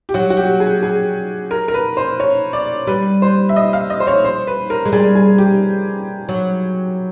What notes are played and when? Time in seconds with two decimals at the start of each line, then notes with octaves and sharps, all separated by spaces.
0.09 G4
0.14 F#3 F#4
0.30 F#4
0.37 G4
0.60 G#4
0.83 G#4
1.51 A#4
1.68 A#4
1.74 B4
1.97 C5
2.20 C#5
2.53 D5
2.87 G3 B4
3.22 C5
3.49 E5
3.56 D#5
3.73 F5
3.90 D#5
4.00 C5
4.07 C#5
4.24 C5
4.47 B4
4.70 A#4
4.85 G#3
4.93 G3 G#4
5.15 G#4
5.38 G4
6.29 F#3